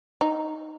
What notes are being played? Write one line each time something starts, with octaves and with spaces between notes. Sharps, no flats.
D#4